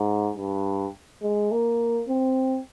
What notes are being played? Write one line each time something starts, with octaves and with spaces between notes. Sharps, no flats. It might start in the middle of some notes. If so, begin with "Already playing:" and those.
Already playing: G#2
G2
G#3
A#3
C4